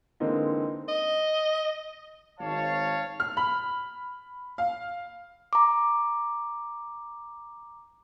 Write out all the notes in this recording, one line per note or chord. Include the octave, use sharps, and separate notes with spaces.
D3 E3 G#3 A#3 C4 D#4
D#5
G#1 C#5 F5 A5
F6
B5
F5
A#5 D6